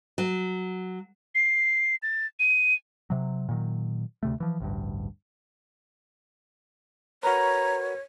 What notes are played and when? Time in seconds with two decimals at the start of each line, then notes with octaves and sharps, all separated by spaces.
0.18 F#3
1.35 C7
2.03 A6
2.39 D#7
3.10 C3 F#3
3.49 A#2 D#3 F#3
4.23 D2 C3 A3
4.40 E3 F3
4.60 A1 D2 G2
7.23 F#4 A#4 B4 C#5 A#5